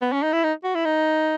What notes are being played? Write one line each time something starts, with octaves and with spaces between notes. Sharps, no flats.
B3
C#4
D#4
E4
D#4
F#4
E4
D#4